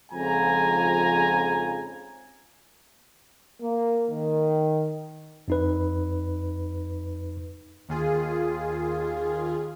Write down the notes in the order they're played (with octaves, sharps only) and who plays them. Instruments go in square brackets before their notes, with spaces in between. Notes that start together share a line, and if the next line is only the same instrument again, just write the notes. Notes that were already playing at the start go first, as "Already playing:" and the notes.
[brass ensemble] F2 G#2 C#3 F3 G#5 A#5
A#3
D#3
[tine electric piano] F2 D#4 B4
[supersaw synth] D#2 F4 G#4